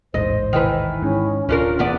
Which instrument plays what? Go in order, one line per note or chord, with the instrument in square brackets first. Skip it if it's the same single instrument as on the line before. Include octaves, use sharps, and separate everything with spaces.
[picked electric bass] D#1 A1 G#2 [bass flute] C5 [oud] D#5
[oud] D#3 E3 B4
[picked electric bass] G#2 [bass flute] C#4
[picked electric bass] D1 [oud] C#4 D4 A#4 [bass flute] F4
[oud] E2 B3 D5